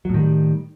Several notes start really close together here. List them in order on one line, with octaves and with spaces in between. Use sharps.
F#3 A2 D#3 G3